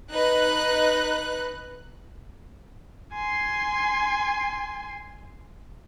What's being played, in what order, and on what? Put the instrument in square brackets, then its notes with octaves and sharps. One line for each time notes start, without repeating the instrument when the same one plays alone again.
[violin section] D#4 B4 F#6
[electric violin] G#5 C6